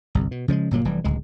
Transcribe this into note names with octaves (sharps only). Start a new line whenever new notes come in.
G1 C2
B2
C#3 F3 G3 G#3
G1 A#2 F#3 A#3
F1 E3 G3
D1 C#2 G#3